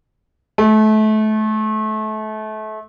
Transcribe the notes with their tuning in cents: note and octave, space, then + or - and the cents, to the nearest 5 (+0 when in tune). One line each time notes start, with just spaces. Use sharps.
A3 -30